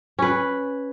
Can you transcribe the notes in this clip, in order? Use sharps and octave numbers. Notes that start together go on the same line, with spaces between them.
C#4 B4